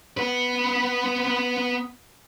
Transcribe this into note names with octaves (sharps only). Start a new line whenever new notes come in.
B3 B4